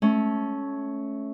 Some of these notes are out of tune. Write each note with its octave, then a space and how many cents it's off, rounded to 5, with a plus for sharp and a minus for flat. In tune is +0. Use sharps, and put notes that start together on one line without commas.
A3 -15 C#4 +0